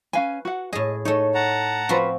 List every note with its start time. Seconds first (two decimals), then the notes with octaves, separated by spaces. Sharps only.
0.13 C#4 B4 F5 G#5
0.45 F#4 F#5
0.73 A2 G#4 D#5
1.05 A3 D#4 A4 C#5
1.34 F#5 A5 A#5
1.89 F3 C4 F4 F#4 B4 C5